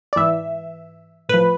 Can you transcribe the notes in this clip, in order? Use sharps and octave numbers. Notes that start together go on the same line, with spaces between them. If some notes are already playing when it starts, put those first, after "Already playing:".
D5
G#2 E3 E5
A2 F3 B4